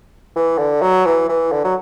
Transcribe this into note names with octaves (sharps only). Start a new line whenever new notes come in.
E3
D3
F#3
E3
E3
D3
F#3